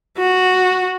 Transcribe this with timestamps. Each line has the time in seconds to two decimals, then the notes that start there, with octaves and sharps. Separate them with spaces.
0.18 F#4